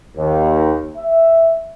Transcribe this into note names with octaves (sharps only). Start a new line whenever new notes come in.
D#2
E5